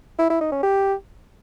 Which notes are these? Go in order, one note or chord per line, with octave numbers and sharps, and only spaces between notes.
E4
E4
D#4
C#4
G4